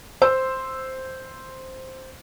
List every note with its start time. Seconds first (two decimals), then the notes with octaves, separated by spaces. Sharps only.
0.22 C5 C6 E6